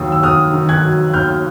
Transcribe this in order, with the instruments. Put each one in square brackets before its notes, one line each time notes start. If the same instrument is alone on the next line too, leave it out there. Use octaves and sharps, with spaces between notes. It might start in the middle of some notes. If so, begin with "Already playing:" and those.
Already playing: [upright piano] D#2 D#3 F#3 D#6 E6
E6
D#2 D#6 F6
D#3
F#6 G#6
F#3
D#2 F6 G6